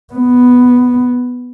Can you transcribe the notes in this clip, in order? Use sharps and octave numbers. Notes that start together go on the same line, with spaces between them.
B3